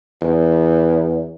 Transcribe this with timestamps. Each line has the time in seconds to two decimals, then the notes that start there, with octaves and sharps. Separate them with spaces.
0.22 E2